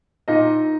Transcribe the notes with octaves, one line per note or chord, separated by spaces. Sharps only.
A#2 D#4 D#5